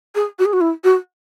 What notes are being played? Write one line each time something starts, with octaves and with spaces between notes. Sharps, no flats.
G#4
F#4
G#4
F#4
E4
F#4